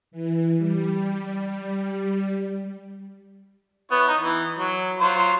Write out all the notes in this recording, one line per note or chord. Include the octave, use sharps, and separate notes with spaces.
E3
G3
B3 E4 C#5
D#4
E3
F#3
F#3 F4 C5